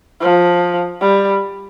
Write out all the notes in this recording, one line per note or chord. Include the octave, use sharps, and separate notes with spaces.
F3
G3